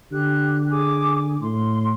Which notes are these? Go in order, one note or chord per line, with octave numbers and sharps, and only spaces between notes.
D3 G4 F#6
G#4 G#5 D6
A2 C6